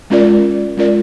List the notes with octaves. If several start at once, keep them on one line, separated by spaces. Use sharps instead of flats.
G#3 C#4 F4 A#4 D5
G#3 C#4 F4 A#4 D5